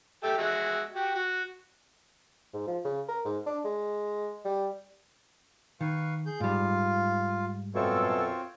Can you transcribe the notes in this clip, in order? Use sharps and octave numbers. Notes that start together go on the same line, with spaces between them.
G4 A4 E5
G#3 F#4 E5
F#4 G4
F#4
G#2
F3
C#3
A#4
G#2
D4
G#3
G3
D#3 B4 F5 C#6
G#4 G6
G#2 G3 F4
F#2 B2 C4 F4 A4 C#5